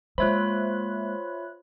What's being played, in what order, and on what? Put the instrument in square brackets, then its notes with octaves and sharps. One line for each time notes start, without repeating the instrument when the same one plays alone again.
[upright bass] G#3 A#3 [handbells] F4 C#5 B5 [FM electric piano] C5 E5 F#6